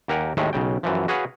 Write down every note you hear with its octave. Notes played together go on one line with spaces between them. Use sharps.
D#2 G4 A#4 F#5 G#5
D#2 A2 D#3 G#3 A3
B1 C#3 G5
F#2 E3 F3
F#4 G#4 B4 C#5 F5 F#5